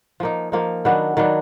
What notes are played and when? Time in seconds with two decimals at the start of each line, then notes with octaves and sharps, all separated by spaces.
0.20 F3 A#3 D#4
0.52 F3 A#3 D#4
0.85 D#3 F#3 B3 D4
1.17 D#3 F#3 B3 D4